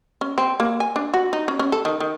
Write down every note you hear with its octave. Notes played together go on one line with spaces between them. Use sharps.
C#4
C4
A#3
G#5
D4
F#4
D#4
C#4
C#4
A4
D#3
D#3